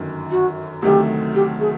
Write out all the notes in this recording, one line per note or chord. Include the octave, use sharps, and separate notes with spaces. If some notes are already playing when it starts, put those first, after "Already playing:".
Already playing: G1 F#2 D#3
F#4
D2 C3 D#3 F#3 A3 G4
G4
G#4